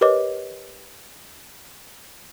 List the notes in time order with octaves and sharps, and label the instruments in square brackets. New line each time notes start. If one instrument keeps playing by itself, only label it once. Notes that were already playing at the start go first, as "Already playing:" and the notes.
[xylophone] G4 A#4 B4 C#5 D#5 D6